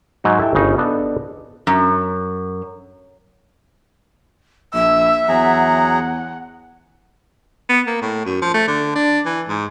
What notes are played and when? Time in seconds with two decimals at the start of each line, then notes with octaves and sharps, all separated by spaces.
0.24 G#2 F#3 D#4
0.40 E4 G4 A4 E5 G5
0.55 G1 C#3 D#4
0.78 B3 D4 A4 D#5
1.67 F#2
4.74 A#1 E5 E6
5.29 E2 F#3 G#4 F#5 A#5
7.69 B3
7.87 A#3
8.02 A2
8.26 F#2
8.42 F3
8.54 A3
8.68 D3
8.95 D4
9.26 E3
9.49 G#2